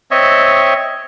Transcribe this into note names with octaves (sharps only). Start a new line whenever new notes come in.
C4 C#5 D#5 E5